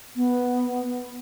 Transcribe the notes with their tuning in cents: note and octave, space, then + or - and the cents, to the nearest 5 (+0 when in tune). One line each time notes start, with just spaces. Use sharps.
B3 -5